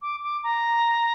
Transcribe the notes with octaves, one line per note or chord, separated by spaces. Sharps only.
D6
D6
A#5